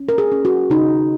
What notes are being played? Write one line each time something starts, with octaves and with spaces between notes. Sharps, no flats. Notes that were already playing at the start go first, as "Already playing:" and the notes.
Already playing: C#4
A#4
G#4
C#4
F#4
C#3 D#4